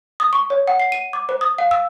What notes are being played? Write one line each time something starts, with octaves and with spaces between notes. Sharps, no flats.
D#6
C#6
C#5
F#5
C7
D#7
D6
C5
D#6
F5
E6